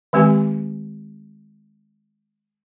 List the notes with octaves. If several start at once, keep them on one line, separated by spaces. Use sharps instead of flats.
D#3 G#3 C4 G4 G#5